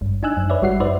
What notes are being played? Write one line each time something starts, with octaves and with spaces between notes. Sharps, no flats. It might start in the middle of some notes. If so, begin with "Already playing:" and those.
G#1 G2
D4 D#4 G#5 E6 F#6
F#2
B4 C#5 D5 E5
G#1 G3 F#4 F#5 C7
F#2 D#4 B4 C5 D5 E5